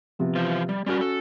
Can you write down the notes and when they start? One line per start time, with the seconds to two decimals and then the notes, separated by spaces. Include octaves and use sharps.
0.19 C3 F3 B3
0.35 E3 F4 C5
0.69 G3
0.86 G3 C#4 F#4 A#4
1.01 A4